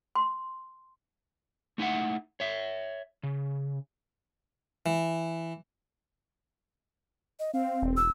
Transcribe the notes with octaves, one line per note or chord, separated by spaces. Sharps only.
C6
A3 D#4 E4 E5 F#5
C#5 E5
C#3
E3
D#5
C4 F5
E1
E6